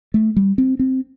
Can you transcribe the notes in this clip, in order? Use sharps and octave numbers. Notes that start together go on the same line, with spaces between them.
A3
G3
C4
C4